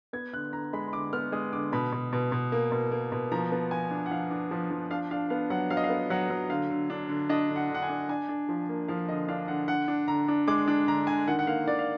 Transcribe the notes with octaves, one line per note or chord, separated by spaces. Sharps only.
B3 G#6
D3 F#6
D3 A#5
G#3 B5
B5
D3 D6
B3 F6
G#3 D#6
D3 D6
B2 B5
B2
B2
B2
A#3
B2
A#3
B2
F3 A#5
B3
F3 G#5
D4
F#5
F3 F5
D4
F3
F3
D4 F5
D4 F5
B3 F5
F#3 F#5
F#3 F5
D#5
F5
B3
F#3 F#5
F#3
D3 F5
D3
D4
D3
D4 D#5
D3
F#5
D3 F#5
G#5
D4
D4 G#5
D4
F3
A#3
F3 F5
D3 D#5
D4 F5
D3 F#5
D3 F#5
D4
D3 A#5
D4
G#3 D6
D4
D3 A#5
D3 G#5
D#3 F#5
F#5
A#3 F5
D#3 D5
F5